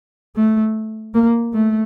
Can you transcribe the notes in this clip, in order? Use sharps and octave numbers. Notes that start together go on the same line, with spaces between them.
A3
A#3
A3